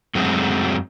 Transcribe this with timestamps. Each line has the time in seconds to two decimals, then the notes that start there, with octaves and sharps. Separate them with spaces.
0.15 F#2 F#3 G#3 A3 C4 F#4